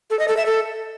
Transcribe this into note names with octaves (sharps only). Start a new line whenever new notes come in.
A4
D#5
A4
E5
A4